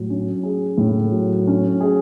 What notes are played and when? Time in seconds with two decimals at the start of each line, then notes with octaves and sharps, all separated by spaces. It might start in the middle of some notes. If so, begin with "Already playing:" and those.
Already playing: A2 F#3
0.10 C#4
0.43 G#4
0.78 A2
1.12 F#3
1.47 C#4
1.81 G#4